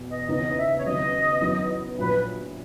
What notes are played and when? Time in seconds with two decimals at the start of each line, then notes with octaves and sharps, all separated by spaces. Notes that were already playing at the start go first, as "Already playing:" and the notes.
Already playing: E2 B2
0.09 D#5
0.28 D#2 C#3 E3 B3 D#4 D#5
0.57 E5
0.77 C#5
0.85 D#2 C#3 F#3 B3 D#5
1.41 F#2 D#3 F#3 B3 E4
1.98 A#1 A#2 F#3 B4